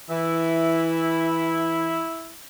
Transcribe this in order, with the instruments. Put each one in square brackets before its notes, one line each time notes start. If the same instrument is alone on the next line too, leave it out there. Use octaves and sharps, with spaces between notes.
[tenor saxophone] E3 [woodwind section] E4